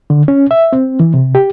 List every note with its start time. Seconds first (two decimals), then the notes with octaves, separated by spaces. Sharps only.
0.10 D3
0.28 C#4
0.51 E5
0.73 C4
1.00 E3
1.14 C3
1.35 G4